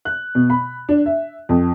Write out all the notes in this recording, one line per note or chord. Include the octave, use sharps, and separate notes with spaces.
F#6
B2
B5
D4
E5
F2